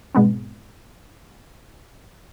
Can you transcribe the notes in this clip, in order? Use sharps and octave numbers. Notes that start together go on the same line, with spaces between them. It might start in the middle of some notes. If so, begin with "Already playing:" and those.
G#2 B2 G#3 B3 C4